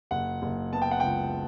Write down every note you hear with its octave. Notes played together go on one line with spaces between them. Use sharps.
F#1 F#5
F#1
B3 A5
G5
F#5
C#2 G5